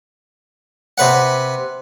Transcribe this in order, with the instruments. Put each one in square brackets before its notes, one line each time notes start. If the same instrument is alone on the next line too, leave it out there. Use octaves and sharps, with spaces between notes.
[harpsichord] C3 B4 F#5